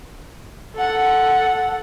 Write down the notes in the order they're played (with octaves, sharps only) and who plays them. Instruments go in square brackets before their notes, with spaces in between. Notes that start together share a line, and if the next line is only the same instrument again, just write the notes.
[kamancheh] A4 F#5